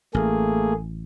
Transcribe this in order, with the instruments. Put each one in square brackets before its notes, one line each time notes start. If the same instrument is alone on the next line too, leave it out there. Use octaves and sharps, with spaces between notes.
[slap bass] A1 [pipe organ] A3 A#3 G#4